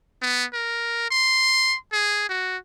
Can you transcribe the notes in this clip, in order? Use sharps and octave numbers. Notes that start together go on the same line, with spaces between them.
B3
A#4
C6
G#4
F#4